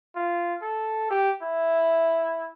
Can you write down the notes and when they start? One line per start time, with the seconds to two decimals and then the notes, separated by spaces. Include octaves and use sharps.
0.16 F4
0.62 A4
1.11 G4
1.42 E4